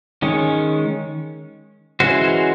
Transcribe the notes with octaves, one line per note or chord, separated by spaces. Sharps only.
D#3 G#3 C#4
E3 G#3 C#4 F#4 C5